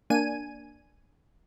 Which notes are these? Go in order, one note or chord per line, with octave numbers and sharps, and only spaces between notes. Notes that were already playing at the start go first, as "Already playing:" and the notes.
A#3 D4 G#5 D#7